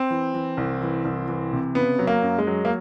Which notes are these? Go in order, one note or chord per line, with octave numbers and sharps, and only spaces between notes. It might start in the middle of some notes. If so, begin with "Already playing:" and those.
Already playing: C4
E3
E3
C2
E3
C2
E3
C3
C#3 B3
F#3
A#3
F#2
G#3
F#3
A#3